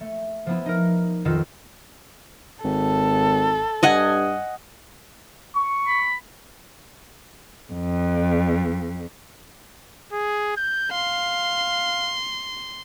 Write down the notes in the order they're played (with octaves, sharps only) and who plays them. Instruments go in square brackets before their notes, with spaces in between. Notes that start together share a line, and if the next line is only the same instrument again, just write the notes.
[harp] A3
F3 B3 E4
D#4 A#4
B1 F2 D#3 F4 E6 E7
[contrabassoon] G#1 [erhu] A4
[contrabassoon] G2 [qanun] D#5 F#5 G#5
[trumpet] C#6
[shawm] B5
[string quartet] F2
[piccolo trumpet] G#4
G6
[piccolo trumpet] F5 [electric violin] C6